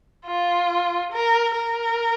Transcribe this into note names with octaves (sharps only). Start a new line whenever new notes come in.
F4
A#4
A#4